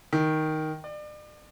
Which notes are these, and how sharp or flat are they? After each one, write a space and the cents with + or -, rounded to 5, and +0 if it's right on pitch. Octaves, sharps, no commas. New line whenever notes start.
D#3 +5
D5 +35